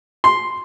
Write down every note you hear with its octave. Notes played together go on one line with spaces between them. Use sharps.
C6